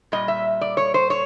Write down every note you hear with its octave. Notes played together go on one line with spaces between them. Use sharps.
A#2 G3 D#5
E5
D5
C#5
C5
C#5